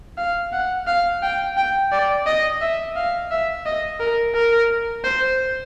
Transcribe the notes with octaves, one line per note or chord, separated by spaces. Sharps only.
F5
F#5
F5
G5
G5
D5
D#5
E5
F5
E5
D#5
A#4
A#4
C5